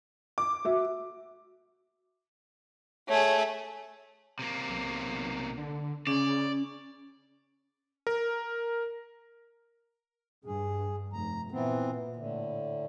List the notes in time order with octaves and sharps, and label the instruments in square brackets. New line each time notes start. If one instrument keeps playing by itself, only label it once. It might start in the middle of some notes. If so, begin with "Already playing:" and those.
[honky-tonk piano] D6
[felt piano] F#4 E5
[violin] A3 G#4 [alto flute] C#5
[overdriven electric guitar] C3 A#3
[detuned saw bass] B1
D3
[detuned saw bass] C#3 [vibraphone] C#4 [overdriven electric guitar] D5
[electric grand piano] A#4
[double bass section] G2 [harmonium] G#4
[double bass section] F1 [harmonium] A#5
[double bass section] A#2 [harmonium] E3 B3 C4
[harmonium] A2 D3